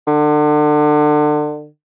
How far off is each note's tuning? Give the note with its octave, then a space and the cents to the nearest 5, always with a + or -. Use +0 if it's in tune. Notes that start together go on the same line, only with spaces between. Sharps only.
D3 +30